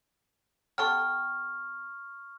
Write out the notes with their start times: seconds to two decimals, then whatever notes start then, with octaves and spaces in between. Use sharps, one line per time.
0.78 B3 G4 A4 C#6 F6